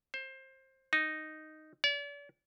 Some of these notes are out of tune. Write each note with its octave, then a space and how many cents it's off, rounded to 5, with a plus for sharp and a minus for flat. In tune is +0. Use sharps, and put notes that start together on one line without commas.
C5 +20
D#4 -5
D5 -40